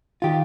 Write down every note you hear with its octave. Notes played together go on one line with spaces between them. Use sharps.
D#3 F4 G4